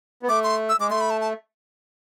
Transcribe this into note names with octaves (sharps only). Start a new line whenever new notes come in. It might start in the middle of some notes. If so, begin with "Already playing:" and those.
B3
A3 D6
C6
E6
G#3 D6
A3 C6
B5
A5
A5